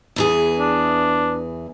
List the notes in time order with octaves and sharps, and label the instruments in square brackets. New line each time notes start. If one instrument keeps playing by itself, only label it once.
[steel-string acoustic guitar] E2 E3 G#4
[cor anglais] D4